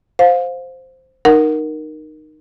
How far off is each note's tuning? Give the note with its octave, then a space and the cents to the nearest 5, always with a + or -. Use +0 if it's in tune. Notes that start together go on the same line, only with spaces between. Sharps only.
C5 +0 F5 +25
D#4 -20 A#4 +5 F#5 +0